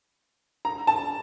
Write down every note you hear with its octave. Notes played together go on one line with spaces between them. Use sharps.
A#5
A5